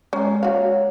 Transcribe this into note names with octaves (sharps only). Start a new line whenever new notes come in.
G#3 C#4 A#5
F#4 C#5 F5